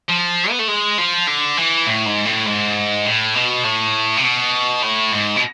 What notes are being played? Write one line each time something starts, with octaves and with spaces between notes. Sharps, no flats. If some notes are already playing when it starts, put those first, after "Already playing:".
F3
B3
A3
G#3
F3
D3
E3
A2
G#2
A2
G#2
A2
B2
A2
C3
B2
A2
G#2
B2